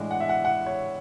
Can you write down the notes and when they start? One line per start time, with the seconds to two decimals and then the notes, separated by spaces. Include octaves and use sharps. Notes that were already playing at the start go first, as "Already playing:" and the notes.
Already playing: A2 E3 G#3 D4
0.11 F#5
0.20 E5
0.29 F#5
0.45 F#5
0.66 C#5